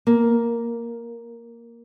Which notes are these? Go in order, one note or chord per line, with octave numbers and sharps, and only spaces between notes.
A#3